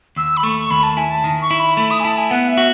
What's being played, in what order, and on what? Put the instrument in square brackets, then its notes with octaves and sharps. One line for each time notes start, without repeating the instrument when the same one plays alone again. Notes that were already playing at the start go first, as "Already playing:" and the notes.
[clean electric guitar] D#2 [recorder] E6
[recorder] B5
[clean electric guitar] A3 [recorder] C#6
[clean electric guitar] D#2 [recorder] B5
[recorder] A5
[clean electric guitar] E4 [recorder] G#5
[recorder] A5
[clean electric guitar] D#3
[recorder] C#6
[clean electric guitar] E4
[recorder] B5
[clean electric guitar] A3 [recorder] B5
[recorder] D#6
G#5
[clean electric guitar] E4 [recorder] A5
[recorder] G#5
[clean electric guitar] B3 [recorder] F#5
[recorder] E5
[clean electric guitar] F#4